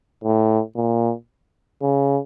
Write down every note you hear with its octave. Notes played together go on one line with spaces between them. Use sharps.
A2
A#2
C#3